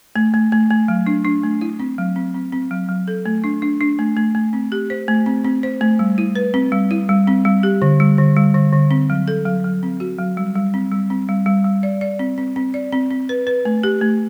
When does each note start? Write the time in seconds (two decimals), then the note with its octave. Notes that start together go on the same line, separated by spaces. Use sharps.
0.16 A3
0.34 A3
0.52 A3
0.70 A3
0.88 F#3
1.06 D4
1.25 D4
1.43 A3
1.61 E4
1.80 C4
1.98 F#3
2.16 C4
2.34 C4
2.53 C4
2.71 F#3
2.89 F#3
3.08 A4
3.26 A3
3.44 D4
3.62 D4
3.81 D4
3.99 A3
4.17 A3
4.35 A3
4.53 C4
4.72 G4
4.90 C5
5.08 A3
5.26 C4
5.44 C4
5.63 C5
5.81 A3
5.99 G3
6.18 E4
6.35 B4
6.54 C4
6.72 G3
6.91 E4
7.09 G3
7.28 C4
7.45 G3
7.63 G4
7.82 D3
8.00 G3
8.18 D3
8.36 G3
8.54 D3
8.73 D3
8.91 C4
9.10 F#3
9.28 A4
9.46 F#3
9.64 F#3
9.83 C4
10.00 F#4
10.19 F#3
10.37 G3
10.55 G3
10.74 C4
10.92 G3
11.10 C4
11.29 G3
11.46 G3
11.65 G3
11.83 D5
12.01 D5
12.19 C4
12.38 C4
12.56 C4
12.74 D5
12.92 C4
13.11 C4
13.29 B4
13.47 B4
13.65 A3
13.83 G4
14.01 A3